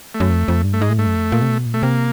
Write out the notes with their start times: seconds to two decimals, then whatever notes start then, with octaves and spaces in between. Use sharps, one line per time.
0.15 A3
0.20 F#2
0.30 F2
0.48 F2
0.64 G2
0.73 A3
0.81 G#2 G#3
0.90 A2
0.98 G#2 A3
1.07 F#2
1.15 F2
1.32 A#2
1.42 C3
1.49 B2
1.66 A#2
1.74 B2 A3
1.83 C3 A#3